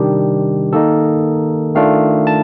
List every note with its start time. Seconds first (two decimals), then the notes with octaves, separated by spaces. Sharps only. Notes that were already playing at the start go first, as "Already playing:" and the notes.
Already playing: C3 D#3 G3 D4 G4
0.73 D#3 A#3 D#4 A4
1.75 D#3 A3 D4 F4 F5
2.27 A5